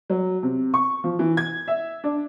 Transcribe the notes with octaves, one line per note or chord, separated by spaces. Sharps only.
F#3
C3
C#6
F3
E3
G#6
E5
D4